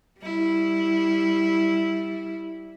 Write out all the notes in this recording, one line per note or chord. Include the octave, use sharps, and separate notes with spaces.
G3 E4